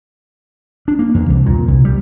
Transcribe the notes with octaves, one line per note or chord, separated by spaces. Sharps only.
D4
A#3
E2
C2
A#2
C2
G3